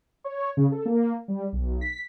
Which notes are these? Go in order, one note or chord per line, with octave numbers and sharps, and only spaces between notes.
C#5
C#3
A4
A#3
G3
B1
B6